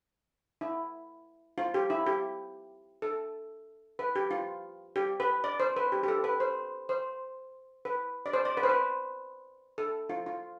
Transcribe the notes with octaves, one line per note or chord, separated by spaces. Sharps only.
E4
F4
G4
E4
G4
A4
B4
G4
F4
G4
B4
D5
C5
B4
G4
G4
A4
B4
C5
C5
B4
D5
C5
D5
B4
C5
B4
A4
F4
F4